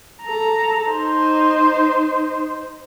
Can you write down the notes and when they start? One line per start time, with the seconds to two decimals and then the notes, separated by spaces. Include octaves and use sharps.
0.22 A4 A#5
0.90 D#4 C5